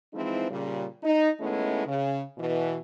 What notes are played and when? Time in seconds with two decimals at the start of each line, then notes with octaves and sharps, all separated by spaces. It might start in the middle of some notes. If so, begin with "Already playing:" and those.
0.13 E3 F3 G#3 C4 D#4 E4
0.50 A#2 C#3 G3
1.03 D#4
1.40 D#3 G#3 A3 B3 C#4 E4
1.86 C#3
2.38 B2 E3